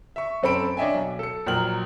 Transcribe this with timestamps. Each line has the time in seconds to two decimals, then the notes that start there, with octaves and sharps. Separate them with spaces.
0.16 E5 C#6
0.43 F#2 C4 A4 B5 D7
0.77 D4 C#5 D#5 E5 G5 G#5
0.94 B1
1.19 A4 C#7
1.47 A#1 F#3 A#4 G5 F6 F#7